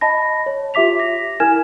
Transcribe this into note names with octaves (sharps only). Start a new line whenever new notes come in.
D#5 A5 B5 A#6
C#5
F4 G4 E5 D6 B6 F7
A#6
E4 A#4 G#5 F6 G#6 E7